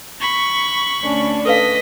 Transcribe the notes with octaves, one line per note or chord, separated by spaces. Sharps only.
B5 C#6
D2 C#4 D4
A4 B4 D#5 F5 B6